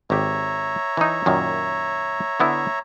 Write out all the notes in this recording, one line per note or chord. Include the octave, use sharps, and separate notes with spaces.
G#1 G4 C#5 E5 A#5
E3 D#4
F#2 A#2 D#3
D3 B3 E4